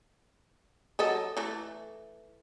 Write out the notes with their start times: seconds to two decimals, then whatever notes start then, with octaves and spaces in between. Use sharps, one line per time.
0.99 F#3 A4 D#5
1.37 E3 A3